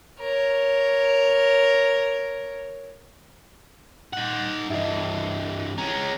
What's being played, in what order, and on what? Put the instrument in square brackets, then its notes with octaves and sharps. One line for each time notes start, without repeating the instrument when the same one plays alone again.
[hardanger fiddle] A#4 C#5
[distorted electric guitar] D#4 F#5
[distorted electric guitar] G2 E3 [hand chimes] D#5 E5
[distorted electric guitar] G#3 C#4 [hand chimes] A#5